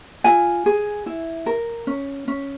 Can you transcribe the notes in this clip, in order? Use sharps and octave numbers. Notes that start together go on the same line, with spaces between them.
F4 G#5
G#4
E4
A#4
C#4
C#4